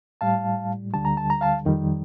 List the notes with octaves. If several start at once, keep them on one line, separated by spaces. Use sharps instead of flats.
A2 G3 F5 A5
D2 D3 G3 A5
A#5
A5
A#5
F5 A5
F2 D#3 G3